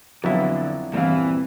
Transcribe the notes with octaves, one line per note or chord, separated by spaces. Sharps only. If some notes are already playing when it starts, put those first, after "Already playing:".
F2 D3 F#3 B3 E4
E2 G2 A#2 E3 C4 F5